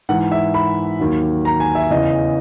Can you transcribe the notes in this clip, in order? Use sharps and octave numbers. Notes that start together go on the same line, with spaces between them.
G#2 E3 F#5
E5
B5
D#2 D#3 F#3
A#5
G#5
E5
E2 C#3 E3 D#5